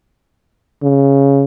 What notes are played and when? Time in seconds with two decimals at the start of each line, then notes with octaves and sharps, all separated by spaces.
0.83 C#3